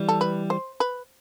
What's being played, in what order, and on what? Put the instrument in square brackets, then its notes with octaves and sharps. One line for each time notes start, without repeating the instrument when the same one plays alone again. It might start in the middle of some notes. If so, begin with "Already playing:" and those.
Already playing: [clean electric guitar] E3 G3
[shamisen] A4
B4
C5
B4